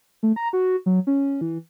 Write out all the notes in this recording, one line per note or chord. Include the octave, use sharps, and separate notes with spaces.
A3
A#5
F#4
F#3
C#4
E3